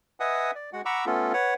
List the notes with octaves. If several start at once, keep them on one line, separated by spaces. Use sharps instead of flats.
B4 D#5 E5 F#5 G#5 D#6
D5
G#3 F#4 F#5
F#5 A#5 B5 C#6 D6 E6
A3 B3 C#4 F4 A4
B4 C#5 F#5